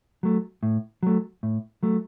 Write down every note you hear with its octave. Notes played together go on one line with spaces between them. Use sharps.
F#3 A3
A2
F#3 A3
A2
F#3 A3